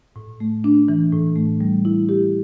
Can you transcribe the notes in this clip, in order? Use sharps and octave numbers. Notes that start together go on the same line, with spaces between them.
A2
A3
D4
E3
A2
A3
G3
E4
G4